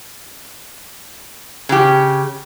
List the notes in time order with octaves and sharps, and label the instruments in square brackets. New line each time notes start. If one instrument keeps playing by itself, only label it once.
[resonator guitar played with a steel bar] C#3 G4